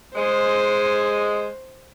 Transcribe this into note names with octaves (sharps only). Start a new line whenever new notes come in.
G#3 C5